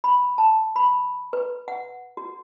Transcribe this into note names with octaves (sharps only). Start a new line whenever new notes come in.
B5
A5
B5
B4
F#5
F#4